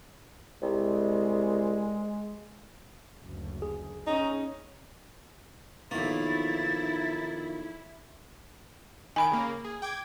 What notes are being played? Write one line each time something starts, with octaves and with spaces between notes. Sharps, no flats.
C2 G#3
F#1 D2
G#4
C#4 D#4
B1 D#3 F3 A#3 E4 A6
D#3 G#5 B5 D7
C#3 A#3
G#4
G5 D6 G#6